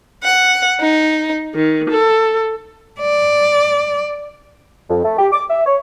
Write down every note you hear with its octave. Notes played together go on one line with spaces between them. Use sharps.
F#5
D#4
D#3
A4
D5
F2
A3
G4
D6
E5
C#5